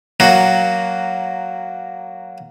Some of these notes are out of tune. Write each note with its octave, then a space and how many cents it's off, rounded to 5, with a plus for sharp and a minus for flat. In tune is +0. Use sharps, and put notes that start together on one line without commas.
F#3 +5 A#3 +0 F#4 +0